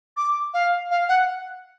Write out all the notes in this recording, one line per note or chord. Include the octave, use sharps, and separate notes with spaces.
D6
F5
F5
F#5